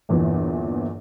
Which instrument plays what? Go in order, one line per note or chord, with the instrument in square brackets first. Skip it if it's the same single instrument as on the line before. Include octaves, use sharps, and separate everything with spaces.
[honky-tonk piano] G1 E2 A#2 E3